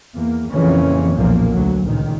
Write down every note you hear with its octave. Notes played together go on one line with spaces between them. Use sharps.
E2 A#3
F2 A#2 C#3 E3 A#3 C#4
B1 E2 A#2 F3 A#3
D2 F#3
C#2 A#2 D#3